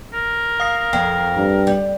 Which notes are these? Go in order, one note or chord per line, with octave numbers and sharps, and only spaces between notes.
A#4
F5 D#6 C7
F2 G5
G2
G3